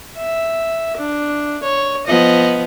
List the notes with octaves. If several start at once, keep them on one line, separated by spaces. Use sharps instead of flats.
E5
D4
C#5
F3 B3 D#5